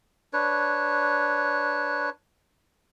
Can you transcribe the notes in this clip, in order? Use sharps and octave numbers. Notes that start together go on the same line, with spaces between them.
D4 B4 C#5